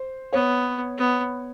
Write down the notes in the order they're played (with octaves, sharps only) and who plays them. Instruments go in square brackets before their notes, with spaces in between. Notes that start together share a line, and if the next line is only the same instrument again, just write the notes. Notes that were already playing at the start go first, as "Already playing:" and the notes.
Already playing: [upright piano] C5
[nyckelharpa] B3 [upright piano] C#5
[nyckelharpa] B3